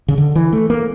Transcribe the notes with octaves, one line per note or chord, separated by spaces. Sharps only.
C#3
D3
E3
A3
A#3